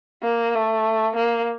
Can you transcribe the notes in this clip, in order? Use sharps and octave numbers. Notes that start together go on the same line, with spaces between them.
A#3
A3
A#3